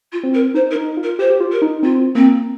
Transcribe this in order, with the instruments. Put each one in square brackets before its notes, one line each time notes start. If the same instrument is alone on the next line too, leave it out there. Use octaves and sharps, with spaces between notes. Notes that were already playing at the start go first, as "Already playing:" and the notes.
[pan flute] F4
[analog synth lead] C4
[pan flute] A#4
[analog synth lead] D#4 [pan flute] C5
[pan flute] A#4
[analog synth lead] D#4
F4
[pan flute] A#4
[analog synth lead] G4 [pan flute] C5
[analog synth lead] G4
F4
[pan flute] A#4
[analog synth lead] D#4
[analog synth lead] C4 [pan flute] F4
[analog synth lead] A#3 [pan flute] C4